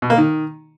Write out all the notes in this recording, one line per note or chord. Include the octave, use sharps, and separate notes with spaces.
B2
A#3
D#3